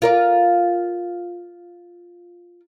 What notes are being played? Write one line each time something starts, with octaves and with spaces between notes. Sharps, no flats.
F4 A#4 D5